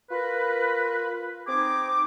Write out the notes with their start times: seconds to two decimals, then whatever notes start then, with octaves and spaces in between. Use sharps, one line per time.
0.10 F4 A#4 B4
1.46 C4 D#4 G#4 D6